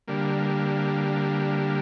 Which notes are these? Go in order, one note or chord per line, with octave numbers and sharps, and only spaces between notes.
D3 G3 A#3